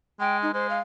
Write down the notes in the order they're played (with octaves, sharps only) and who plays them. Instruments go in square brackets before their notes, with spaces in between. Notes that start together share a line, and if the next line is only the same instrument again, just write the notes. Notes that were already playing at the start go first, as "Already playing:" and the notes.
[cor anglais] G#3 [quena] G5
[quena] D#4
[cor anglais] G#3 [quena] C5
[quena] F5